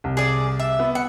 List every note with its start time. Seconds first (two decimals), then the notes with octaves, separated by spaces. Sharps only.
0.04 C2
0.17 G#4 D5
0.60 E5
0.79 B3
0.95 F#5